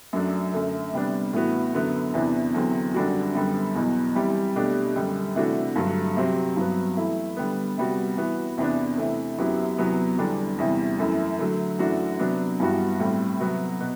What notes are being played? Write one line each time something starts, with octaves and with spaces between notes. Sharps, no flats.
F#2 F#3 A3 D4
F#2 D3 A3
C3 G3 B3 D4
A2 E3 B3 F#4
F#2 D3 F#3 B3
E2 C3 E3 B3 D4
E2 D3 F#3 C4
F#2 D3 G3 D4 F#4
F#2 D3 G3 B3
E2 B2 F#3
E3 G3 C4 G4
B2 A3 D4 G4
F#2 D3 G3
C3 E3 A3 D4 F#4
G2 D3 F#3 A3
C3 F#3 C4 G4
G2 F#3 B3
E3 A3 E4
D3 G3 B3
C3 G3 B3 F#4
E3 B3 F#4
E2 C3 E3 B3 D4
C3 E3 A3
F#2 F#3 B3 E4 G4
E2 C3 F#3 B3
E2 D3 G3 D4
E2 C3 E3 G3
F#2 E3 A3 E4
D3 F#3 A3
F#2 E3 A3 D4 F#4
C3 F#3 B3 D4
G2 E3 G3 B3 F#4
A2 G3 C4
C3 F#3 B3 F#4
B2 B3